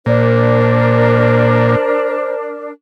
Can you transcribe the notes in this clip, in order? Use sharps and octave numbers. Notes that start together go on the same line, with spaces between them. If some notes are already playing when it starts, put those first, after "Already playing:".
A#2 D4 A#4 C5